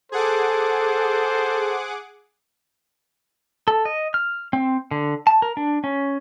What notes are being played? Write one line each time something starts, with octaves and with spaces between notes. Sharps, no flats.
G#4 A4 C5 F#5 D6
A4
D#5
F6
C4
D3
A5
A#4
D4
C#4